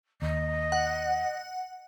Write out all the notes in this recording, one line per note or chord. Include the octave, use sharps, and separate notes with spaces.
D#2 D#5
F#5